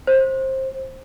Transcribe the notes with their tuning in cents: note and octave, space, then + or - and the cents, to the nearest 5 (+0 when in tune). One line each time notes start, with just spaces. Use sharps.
C5 +20